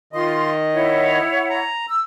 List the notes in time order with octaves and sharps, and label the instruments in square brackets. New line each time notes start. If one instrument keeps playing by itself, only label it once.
[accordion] D#3 D#5 [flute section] F4 C6
[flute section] E4 C#5 F#5
[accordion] A#5
[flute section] E6